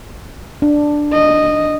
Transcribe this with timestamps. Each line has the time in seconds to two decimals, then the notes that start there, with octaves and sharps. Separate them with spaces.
0.62 D4
1.13 D#5